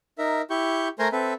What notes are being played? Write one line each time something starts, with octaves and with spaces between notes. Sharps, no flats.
D#4 A#4 E5
E4 G4 C#6 G6
A3 A#4 C5 G#5 A#5 C6
C4 A4 B4 E5